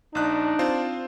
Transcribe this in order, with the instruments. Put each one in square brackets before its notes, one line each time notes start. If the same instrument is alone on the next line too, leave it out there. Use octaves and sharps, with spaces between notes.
[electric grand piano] A#1 F#6 [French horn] D4 [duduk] D#4
[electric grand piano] C4 F4 C5